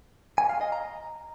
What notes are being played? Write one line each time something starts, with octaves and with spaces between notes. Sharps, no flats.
G#5
F5
D#5
A#5